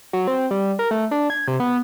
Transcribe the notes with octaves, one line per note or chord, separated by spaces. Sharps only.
F#3
C4
G3
A#4
A3
D4
G#6
C3
B3